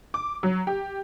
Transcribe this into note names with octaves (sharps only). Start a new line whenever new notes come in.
D6
F#3
G4